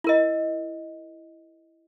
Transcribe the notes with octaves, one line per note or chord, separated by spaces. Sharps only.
E4 A#4 D#5